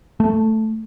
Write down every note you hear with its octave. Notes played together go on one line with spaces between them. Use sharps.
A3